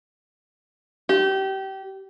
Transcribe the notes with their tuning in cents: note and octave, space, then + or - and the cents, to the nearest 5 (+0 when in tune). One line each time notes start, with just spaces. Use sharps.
G4 -25